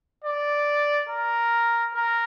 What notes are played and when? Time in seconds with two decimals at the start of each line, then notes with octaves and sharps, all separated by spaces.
0.24 D5
1.09 A#4
1.94 A#4